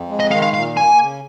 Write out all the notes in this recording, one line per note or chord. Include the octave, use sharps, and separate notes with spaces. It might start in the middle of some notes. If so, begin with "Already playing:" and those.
Already playing: F2
G#3
D#5
D#3 F5
F5
A#2 F5
A#3 G#5
C#3